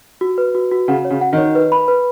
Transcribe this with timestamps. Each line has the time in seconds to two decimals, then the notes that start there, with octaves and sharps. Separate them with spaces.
0.21 F#4
0.38 B4
0.55 F#4
0.71 F#4
0.88 C#3 F#5
1.05 C#5
1.10 C#3
1.21 F#5
1.33 D#3 C#5
1.55 B4
1.72 B5
1.88 B4